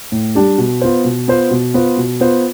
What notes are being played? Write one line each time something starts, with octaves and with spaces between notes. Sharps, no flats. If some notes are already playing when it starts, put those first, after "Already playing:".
A2
G3 D4 G4
B2
B3 F4 C5
B2
B3 F4 C5
B2
B3 F4 C5
B2
B3 F4 C5